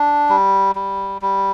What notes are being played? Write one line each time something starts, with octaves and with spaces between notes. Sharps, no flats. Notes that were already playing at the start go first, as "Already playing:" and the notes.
Already playing: D4
G3
G3
G3